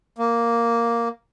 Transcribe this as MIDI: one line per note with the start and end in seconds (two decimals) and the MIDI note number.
0.18 1.08 58